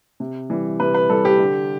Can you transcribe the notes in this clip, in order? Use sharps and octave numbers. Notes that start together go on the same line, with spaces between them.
C3
E3 G3
C3 B4
B4
E3 G3 A4
G4
D3